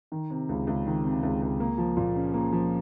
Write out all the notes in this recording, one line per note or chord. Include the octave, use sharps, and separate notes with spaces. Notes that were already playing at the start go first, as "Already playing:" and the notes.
D#3
C3
C#2
C#2
D#3
C3
C#2
C#2
A#3
F3
A#2
C#4
A#3
F3